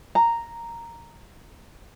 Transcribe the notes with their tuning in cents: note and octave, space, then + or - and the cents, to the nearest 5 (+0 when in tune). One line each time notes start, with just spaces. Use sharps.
A#5 -5